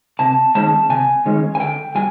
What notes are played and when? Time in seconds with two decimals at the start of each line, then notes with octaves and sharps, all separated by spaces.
0.19 C3 A5
0.55 D#3 G#3 C#4 A5
0.89 C3 G#5
1.26 D#3 G#3 C#4
1.55 G#5
1.60 D3 G5
1.95 G3 G#5